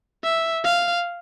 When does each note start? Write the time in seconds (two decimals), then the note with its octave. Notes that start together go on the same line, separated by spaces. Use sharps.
0.24 E5
0.64 F5